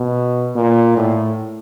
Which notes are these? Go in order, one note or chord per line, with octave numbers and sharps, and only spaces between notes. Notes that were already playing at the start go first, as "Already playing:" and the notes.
Already playing: B2
A#2
A2